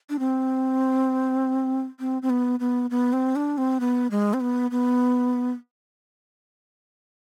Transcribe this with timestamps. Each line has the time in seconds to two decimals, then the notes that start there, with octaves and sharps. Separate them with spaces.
0.10 D4
0.19 C4
2.00 C4
2.22 C4
2.30 B3
2.60 B3
2.90 B3
3.13 C4
3.36 D4
3.58 C4
3.80 B3
4.11 G#3
4.34 C4
4.40 B3
4.71 B3